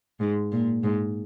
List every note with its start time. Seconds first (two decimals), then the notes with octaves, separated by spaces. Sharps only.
0.20 G#2
0.52 A#2
0.83 G#2